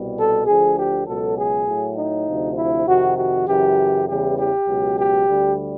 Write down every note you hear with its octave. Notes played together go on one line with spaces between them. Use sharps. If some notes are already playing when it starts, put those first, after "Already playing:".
Already playing: C2 B2 G3
A4
D2 D3 F3 G#4
G4
C#2 B2 F#3 A4
G#4
A2 F#3
D#4
D2 C3 F3
E4
F2 C3 D#3 F#4
F#4
F#2 C#3 E3 G4
E2 C#3 E3 G3 G4
G4
C#2 B2 F#3
G4
D2 D3 G3